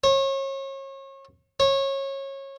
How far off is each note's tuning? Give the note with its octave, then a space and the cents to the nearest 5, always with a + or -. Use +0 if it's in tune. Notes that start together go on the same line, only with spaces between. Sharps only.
C#5 -35
C#5 -25